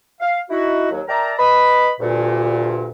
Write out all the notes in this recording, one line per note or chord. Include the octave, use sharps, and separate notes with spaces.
F5
D#4 E4 F#4
D#2 F#3
A#4 D5 E5 G5 A5 A#5
B4 D#5 B5
D2 G2 A#2